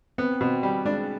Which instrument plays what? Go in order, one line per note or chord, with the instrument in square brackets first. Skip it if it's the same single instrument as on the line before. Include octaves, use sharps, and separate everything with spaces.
[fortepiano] B3 [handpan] C4
[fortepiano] B2 [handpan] C4
[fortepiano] G3
[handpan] G#3 [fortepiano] D4